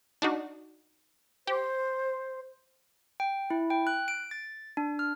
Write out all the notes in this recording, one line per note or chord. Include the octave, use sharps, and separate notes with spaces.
D4 D#4 F#4
G4 C5
G5
E4
G5
F#6
D7
A6
D4
F6